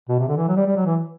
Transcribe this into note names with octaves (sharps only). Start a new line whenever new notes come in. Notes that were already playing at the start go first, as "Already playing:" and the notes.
B2
C3
D3
E3
F#3
G3
G3
F#3
E3